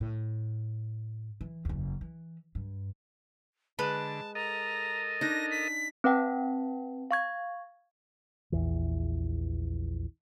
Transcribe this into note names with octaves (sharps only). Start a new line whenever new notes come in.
A2
E3
F#1 E2
E3
G2
D3 G#3 B4 A5 B5
A4 A#4 D#5 A#5
D4 D#4 A#6
B6
C4 B4 F#5 G5 A5
F5 C#6 G#6
A#1 E2 E3